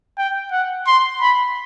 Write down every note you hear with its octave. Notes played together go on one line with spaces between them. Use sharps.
G5
F#5
C6
B5